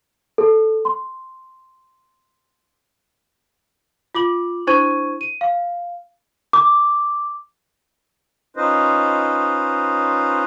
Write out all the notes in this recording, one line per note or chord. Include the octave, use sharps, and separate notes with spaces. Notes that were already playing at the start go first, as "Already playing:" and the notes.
A4
C6
F4 D6 F#7
D4 E4 C5 C#6 G#6 D#7
D#7
F5
D6
C#4 D#4 F4 B4 C5 D#5